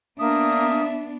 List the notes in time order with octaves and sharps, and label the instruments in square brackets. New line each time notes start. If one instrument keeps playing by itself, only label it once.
[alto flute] A#3 [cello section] B3 D4 [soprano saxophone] E5 [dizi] D#6